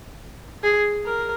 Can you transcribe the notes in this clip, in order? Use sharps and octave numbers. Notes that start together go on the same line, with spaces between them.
G#4
A#4